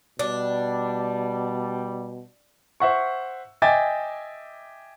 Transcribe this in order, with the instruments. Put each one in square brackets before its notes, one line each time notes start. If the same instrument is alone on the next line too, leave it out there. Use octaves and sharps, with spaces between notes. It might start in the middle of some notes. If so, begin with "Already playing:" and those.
[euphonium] B2 [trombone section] G3 [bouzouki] D4
[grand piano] C5 E5 F#5 C#6
D#5 E5 G5 G#5 D6 A6